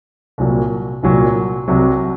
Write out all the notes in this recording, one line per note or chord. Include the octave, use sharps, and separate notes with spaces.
C2 A#2 F#3
C2 A#2 F#3
C2 C3 F#3